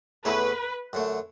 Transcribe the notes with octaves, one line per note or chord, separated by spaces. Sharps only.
E2 D3 A3 C#4 E4 B4
F#2 D3 A3